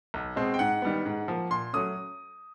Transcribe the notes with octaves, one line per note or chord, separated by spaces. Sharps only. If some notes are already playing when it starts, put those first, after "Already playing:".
B1
B2 G#3 C4
G5
G#2 F#5
D#3 G3 B3
G#2
F3 A#3
A#2 C6
F#3 A3 C#4 D#6